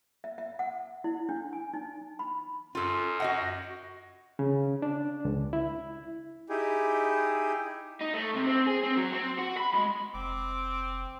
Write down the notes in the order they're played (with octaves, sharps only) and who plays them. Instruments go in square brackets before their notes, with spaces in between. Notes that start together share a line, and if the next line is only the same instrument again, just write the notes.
[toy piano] E5
E5
F#5
E4
D4
G#5
D#4
B5
[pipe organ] F#2 [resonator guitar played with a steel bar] F4 A4
[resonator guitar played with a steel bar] F#4 D#5 F#5
[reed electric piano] C#3
D4
C#2
E4
[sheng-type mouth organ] D#4 E4 G4 G#4
[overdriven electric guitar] D#4
A3
C3
C4
G#4
C4
F#3
C4
F#4
B5
G#3
[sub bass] F1 [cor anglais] C4 [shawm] D6